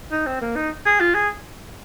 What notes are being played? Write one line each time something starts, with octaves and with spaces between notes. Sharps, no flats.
D#4
C4
A#3
D#4
G#4
F4
G#4